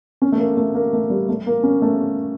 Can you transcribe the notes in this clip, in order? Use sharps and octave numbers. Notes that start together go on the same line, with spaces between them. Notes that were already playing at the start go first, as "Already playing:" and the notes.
C#4
A3
A#3
A3
A#3
A3
G3
A3
A#3
C#4
A3